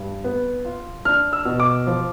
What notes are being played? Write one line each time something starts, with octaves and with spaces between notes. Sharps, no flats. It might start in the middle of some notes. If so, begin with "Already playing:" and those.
Already playing: G2
B3
F4
D4 F6
E6
B2
D6
F3